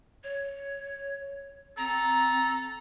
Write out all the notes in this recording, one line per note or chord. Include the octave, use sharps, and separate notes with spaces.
C#5
C4 A4 A#5